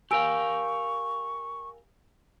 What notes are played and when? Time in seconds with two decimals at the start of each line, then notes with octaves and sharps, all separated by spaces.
0.11 G4 A#4 F5 G#5 C#6 E6 D7